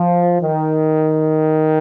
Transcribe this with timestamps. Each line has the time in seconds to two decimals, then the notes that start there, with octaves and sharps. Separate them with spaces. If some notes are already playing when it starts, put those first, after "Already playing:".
Already playing: F3
0.41 D#3